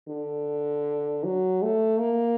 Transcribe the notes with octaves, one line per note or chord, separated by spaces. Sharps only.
D3
F#3
A3
A#3